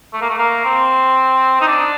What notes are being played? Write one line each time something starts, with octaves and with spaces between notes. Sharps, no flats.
A3
A#3
A3
A#3
C4
D#4
D4